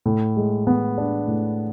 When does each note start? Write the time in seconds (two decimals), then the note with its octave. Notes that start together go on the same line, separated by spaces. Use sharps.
0.06 A2
0.37 G#3
0.67 B3
0.98 D4
1.28 A2